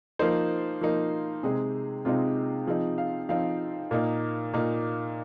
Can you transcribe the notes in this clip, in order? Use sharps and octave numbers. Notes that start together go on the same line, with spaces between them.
F3 A#3 D#4 C5
F3 A#3 D#4
C3 G#3 C4 D#4 G#4
C3 G#3 C4 D#4 F4
F3 C4 D#4 G#4
F5
F3 C4 D#4 F5
A#2 A#3 D#4
A#2 A#3 D#4